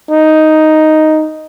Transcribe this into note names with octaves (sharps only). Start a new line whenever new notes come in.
D#4